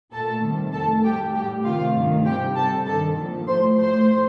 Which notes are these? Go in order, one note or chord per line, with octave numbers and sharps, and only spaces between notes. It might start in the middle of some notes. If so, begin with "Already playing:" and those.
A#2 A3 A4 A5
C3 D#3 G3
F2 D#3 A3 A4 A5
A2 G3 G4 G5
A2 G3 G4 G5
C3 D#3 A3 F4 F5
G2 D#3 A3
C3 G3 G4 G5
C3 G3 A4 A5
G2 D#3 G3 A4 A5
A#2 F3 A3
A2 F3 A3 C5 C6
A2 A3 C5 C6